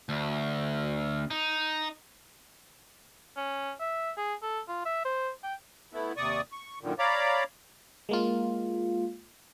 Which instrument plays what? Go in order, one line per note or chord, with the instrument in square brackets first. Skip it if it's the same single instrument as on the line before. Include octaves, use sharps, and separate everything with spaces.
[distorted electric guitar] D2
D#4
[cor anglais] C#4
E5
G#4
A4
F4
E5
C5
G5
[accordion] A3 B3 E4
D#2 C3 D5 C#6 D#6
C#6
F#2 A#2 D3 D#3
C#5 D5 F5 A#5 B5 D6
[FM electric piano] G#3 A#3 F4